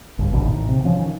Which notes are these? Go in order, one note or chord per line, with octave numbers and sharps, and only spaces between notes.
G1 C#2
A#1 B2 D#3 D4
A1 A2 D#3
C3
E3 F3 C#4
D#3